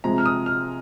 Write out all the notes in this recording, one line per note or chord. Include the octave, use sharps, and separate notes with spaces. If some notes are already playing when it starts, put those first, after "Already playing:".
C3 F3 G#3 A#5
F6
D#6
F6